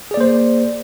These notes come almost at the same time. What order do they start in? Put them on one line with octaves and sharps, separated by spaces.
G#4 D5 A#3 C5